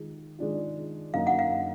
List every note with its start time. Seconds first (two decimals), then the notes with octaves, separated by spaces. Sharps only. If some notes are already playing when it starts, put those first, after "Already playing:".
Already playing: D#3 G#3 F4
0.39 D#3 G#3 D4 F4
1.14 F#2 D3 F#3 A#3 D#4 F5
1.27 F#5
1.39 F5